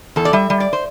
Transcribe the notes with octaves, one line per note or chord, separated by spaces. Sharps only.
E2 A4
D5
G3 E5
G3
D5
C5